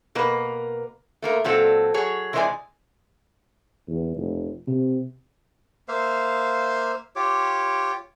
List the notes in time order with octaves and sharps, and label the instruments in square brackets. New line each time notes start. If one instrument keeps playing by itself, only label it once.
[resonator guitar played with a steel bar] B2 A#3 A#4 B4
A3 A#3 A#4
A#2 F#3 C4 A4
F#3 G#4 C#5
C3 E3 G#3 C5 D5 G#5
[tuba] E2
F1
C3
[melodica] A#3 C5 E5 F5
F4 G4 C#5 D6